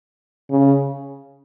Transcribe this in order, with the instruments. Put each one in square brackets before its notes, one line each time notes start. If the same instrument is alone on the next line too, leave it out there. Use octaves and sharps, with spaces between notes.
[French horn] C#3